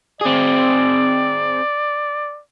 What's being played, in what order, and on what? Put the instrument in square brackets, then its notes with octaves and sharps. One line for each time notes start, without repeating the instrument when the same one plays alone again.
[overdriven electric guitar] C4 G#4 [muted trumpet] D5